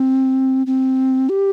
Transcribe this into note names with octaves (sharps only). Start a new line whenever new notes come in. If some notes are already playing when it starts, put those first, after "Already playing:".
Already playing: C4
C4
G4